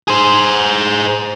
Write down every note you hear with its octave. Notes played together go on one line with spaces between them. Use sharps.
G#4 C5